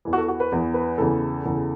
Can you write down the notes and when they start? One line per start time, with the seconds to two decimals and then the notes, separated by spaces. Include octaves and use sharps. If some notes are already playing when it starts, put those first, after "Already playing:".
0.05 E2 E3
0.13 F#4
0.18 A4
0.28 F#4
0.40 B4
0.52 E2 E3
0.74 B4
0.98 E2 C#3 E3 A4
1.44 E2 C#3 E3